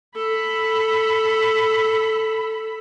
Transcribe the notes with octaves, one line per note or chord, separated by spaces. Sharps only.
A4 B5